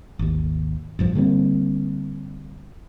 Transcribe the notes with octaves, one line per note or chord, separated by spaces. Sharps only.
G#1 D#2
A1 G2 F3
D3 G3 A#3 C4